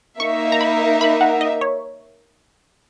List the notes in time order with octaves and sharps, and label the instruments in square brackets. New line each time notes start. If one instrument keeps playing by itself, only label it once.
[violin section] A#3 D#4 A#4 E5 [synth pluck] C#6
[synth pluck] A#5
B5
B5
F#5
D#5
C#5